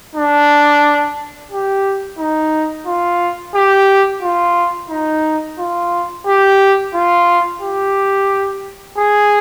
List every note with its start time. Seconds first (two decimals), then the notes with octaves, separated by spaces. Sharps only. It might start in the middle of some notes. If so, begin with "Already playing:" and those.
0.15 D4
1.52 G4
2.19 D#4
2.87 F4
3.55 G4
4.22 F4
4.90 D#4
5.59 F4
6.27 G4
6.94 F4
7.62 G4
8.98 G#4